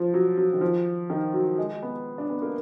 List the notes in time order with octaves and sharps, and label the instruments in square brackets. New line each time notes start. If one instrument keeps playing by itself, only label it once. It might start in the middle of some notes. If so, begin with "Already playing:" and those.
Already playing: [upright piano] F3
F#3
F#3
D#3
F3
D#3
F#3
G#3
B3
D4
B3
A#3